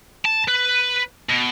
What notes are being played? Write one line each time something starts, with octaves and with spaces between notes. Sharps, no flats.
A5
B4
B2